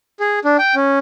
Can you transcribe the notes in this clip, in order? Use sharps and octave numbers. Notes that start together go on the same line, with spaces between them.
G#4
D4
G5
C#4